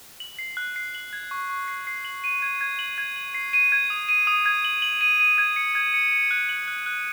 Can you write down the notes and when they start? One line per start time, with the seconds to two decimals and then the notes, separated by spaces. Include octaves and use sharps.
0.20 F#7
0.39 C7
0.57 F#6
0.76 C7
0.95 F#7
1.13 G#6
1.31 C#6
1.49 C#6
1.68 C7
1.87 C7
2.05 F#7
2.24 D#7
2.42 G#6
2.61 G#6
2.79 F#7
2.98 G#6
3.16 F#7
3.34 C7
3.53 D#7
3.72 G#6
3.90 D#6
4.09 D#7
4.27 D#6
4.46 G#6
4.64 F#7
4.82 F#7
5.01 D#7
5.20 D#7
5.38 G#6
5.56 C#7
5.75 G#6
5.94 C#7
6.12 C#7
6.31 F#6
6.49 F#7
6.68 F#6
6.86 F#6